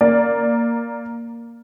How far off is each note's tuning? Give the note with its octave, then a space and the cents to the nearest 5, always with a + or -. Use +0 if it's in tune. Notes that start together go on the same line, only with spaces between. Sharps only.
A#3 +0 D5 +0